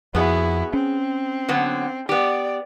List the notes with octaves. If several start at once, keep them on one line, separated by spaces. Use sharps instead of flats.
F2 B3 E4 F#4 G#4
C4 C#4
D3 F#3 B3
B3 G4 D5